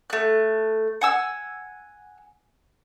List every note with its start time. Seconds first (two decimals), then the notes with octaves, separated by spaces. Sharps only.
0.10 A3 F#6
1.01 F#5 G#5 E6